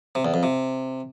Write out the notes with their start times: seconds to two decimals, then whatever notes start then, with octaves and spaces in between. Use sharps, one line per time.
0.15 C3
0.25 E2
0.34 F2
0.43 C3